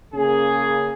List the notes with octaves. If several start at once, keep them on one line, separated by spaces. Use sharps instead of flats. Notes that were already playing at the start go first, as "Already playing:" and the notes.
C#3 A#3 G#4